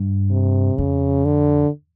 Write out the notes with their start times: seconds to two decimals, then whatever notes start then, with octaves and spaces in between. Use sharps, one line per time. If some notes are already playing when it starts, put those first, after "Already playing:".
Already playing: G2
0.30 C3
0.77 F2 C#3
1.25 D3